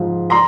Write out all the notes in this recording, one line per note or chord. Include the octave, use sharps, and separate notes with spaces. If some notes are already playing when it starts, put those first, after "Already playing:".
Already playing: G#2 F3
A#5 C6